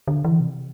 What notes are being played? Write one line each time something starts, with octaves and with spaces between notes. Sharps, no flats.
D3
E3
C3